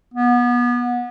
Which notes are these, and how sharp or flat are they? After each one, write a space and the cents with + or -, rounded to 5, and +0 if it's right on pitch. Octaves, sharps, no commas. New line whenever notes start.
B3 -25